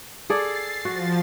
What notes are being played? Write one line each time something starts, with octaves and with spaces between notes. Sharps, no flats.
G#4 A4 D5 A6 C7
F3 F#4 A6